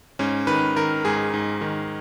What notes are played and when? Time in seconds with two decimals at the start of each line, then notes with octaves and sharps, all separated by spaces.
0.19 G#2 C#4
0.47 D#3 B4
0.76 D#3 A#4
1.05 G#2 G#4
1.34 G#2
1.61 D#3